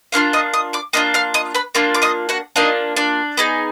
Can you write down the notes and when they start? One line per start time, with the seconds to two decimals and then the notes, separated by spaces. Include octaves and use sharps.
0.12 A#3 D4 F4 F5 F6
0.33 D#5 D#6
0.54 D#5 D#6
0.73 D5 D6
0.93 A#3 D4 F4 D#5 D#6
1.14 F5 F6
1.34 D#5 D#6
1.55 B4 B5
1.75 A#3 D4 F4
1.94 D6
2.02 D#5 D#6
2.29 F#4 F#5
2.56 A#3 D4 D#4 F4 D#5
2.96 D4 D5
3.37 B3 D#4 G#4